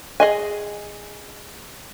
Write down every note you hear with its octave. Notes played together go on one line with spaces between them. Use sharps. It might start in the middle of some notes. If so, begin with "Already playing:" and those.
G#4 D#5 G#5